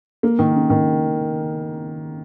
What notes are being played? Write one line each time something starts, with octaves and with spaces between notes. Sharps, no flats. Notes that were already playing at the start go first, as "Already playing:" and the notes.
A#3
D#3
C#3
D#3